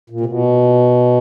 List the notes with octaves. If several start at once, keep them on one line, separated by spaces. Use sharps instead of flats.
A#2
C3
B2